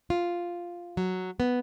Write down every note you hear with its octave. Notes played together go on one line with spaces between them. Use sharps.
F4
F#3
B3